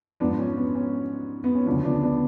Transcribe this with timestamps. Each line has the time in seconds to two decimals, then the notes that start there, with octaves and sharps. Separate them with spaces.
0.20 F3 B3 D4
0.23 G#2
0.38 C#4
0.57 B3
0.75 C#4
1.44 B3
1.55 C#4
1.66 D2 C#3 F3 B3 D4
1.85 B3 D4
2.03 B3 D4